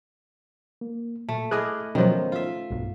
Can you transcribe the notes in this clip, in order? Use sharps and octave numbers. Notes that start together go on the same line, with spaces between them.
A#3
A#2 A3
E4 G#4 D#5 D6 F6 F#6
B2 D#3 F3 F#3 C#4 C5
F4 E5
B1 G2